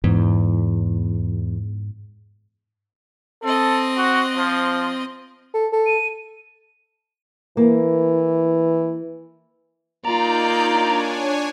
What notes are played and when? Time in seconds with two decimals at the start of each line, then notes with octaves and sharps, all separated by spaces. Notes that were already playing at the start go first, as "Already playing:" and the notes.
0.04 E2 G#2
3.43 C4 A4 D#5
3.97 F#4
4.37 F3
5.54 A4
5.73 A4
5.87 D#7
7.57 E3 A#3
10.05 A#3 D#4 F4 D5 A#5 G6
10.64 D4 C#5 G#5